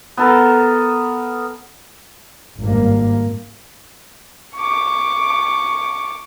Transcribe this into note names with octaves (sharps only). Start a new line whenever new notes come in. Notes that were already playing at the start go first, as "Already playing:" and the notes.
B3 A4 A#4
G#1 G2 A#3
C#6 D6